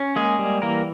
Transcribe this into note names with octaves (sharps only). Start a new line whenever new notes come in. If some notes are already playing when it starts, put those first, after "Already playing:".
Already playing: C#4
G#3 A#3 G#4
G3
E3 A#3 A#4